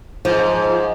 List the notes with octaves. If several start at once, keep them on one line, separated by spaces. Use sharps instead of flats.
G#2 F3